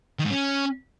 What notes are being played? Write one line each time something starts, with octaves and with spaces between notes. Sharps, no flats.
D#3
G#2
C#4